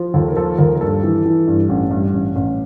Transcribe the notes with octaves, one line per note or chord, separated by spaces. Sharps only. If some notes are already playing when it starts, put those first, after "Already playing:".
Already playing: F3
D#2 A4
A#4
F3 A4
D#2 A#4
A#4
G2 A4
E3
E3
G2
A1
G2
A1
A1